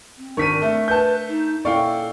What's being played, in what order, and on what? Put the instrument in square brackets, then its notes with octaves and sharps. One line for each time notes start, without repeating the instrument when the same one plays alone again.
[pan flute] C4
[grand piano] G#1 D#7 [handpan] D4 A#4 [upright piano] C#6 B6
[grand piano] A3
[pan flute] B4 [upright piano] A5 G6
[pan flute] D#4
[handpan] A#2 C#4 E4 [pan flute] A4 [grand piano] D5 F5 G5 [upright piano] C#6